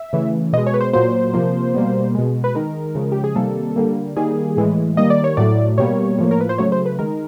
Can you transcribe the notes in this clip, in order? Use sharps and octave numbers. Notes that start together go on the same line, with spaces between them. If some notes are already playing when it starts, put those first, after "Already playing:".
Already playing: E5
C#3 E3 A3
B2 G#3 D#5
C#5
B4
C5
A#2 F#3 A#3 C5
C3 F3 A#3
B2 G3 A#3
B2 G#3
B4
D#3 G#3 A#4
C#3 F3 G#3
G4
G#4
C3 D#3 G3 A#3 A4
D3 G3 A#3
D#3 G3 A#3 G#4
A2 E3 G#3
D#3 G3 A#3 D#5
D5
C#5
A2 F#3 A3 D5
B2 G3 A#3 C#5
A2 F3 A#3
A#4
B4
C5
C#3 F#3 A3 C#5
C5
B4
D#3 G#3 A#4